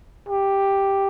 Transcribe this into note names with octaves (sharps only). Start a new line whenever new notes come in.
G4